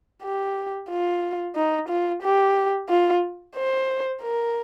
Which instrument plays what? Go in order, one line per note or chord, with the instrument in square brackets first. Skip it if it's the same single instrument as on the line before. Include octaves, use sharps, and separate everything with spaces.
[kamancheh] G4
F4
D#4
F4
G4
F4
C5
A#4